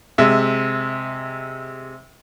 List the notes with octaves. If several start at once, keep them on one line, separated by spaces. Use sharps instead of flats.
C3 G#3 E5